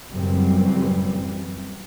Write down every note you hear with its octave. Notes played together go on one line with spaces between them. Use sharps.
F#1 F#2 A2 E3 G3 C4